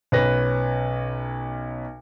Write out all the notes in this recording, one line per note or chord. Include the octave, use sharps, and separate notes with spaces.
B1 C#4 B4 A#6